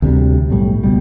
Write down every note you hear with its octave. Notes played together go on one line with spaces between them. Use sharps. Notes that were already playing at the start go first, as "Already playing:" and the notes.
D2 C3 F#3 G3
B1 A2 G3
C#2 B2 G3